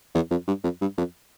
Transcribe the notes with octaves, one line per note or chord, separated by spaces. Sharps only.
E2
F2
G2
F2
G2
F2